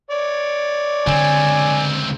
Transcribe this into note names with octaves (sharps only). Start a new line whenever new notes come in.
C#5 D5
C#2 D3 C4 G#5